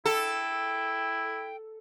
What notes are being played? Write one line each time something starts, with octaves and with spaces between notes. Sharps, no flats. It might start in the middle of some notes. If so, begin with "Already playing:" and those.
E4 A4 G5